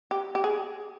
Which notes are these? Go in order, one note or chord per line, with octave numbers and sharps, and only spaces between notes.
G4
G4
G#4